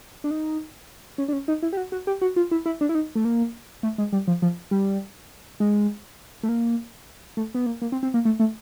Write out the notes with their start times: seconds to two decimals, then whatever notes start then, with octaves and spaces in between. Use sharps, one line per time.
0.24 D4
0.31 D#4
1.18 C#4
1.28 D4
1.33 C#4
1.48 D#4
1.62 E4
1.73 G4
1.77 F#4
1.92 F#4
2.07 G4
2.21 F#4
2.36 F4
2.51 E4
2.66 E4
2.81 D4
2.89 E4
2.95 D#4
3.15 A3
3.25 A#3
3.83 A3
3.98 G#3
4.12 G3
4.27 F3
4.42 F3
4.71 G3
5.60 G#3
6.43 A3
6.49 A#3
7.37 A3
7.55 B3
7.66 A#3
7.82 A#3
7.92 C4
8.03 C4
8.14 A#3
8.25 A3
8.40 A3